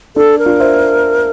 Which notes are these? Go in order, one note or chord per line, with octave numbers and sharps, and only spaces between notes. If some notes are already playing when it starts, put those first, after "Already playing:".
D4 A4
A#4
D4 F4
C5 E5